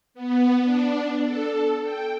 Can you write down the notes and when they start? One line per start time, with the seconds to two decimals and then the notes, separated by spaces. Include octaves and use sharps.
0.14 B3
0.63 D4
1.24 A4
1.83 G5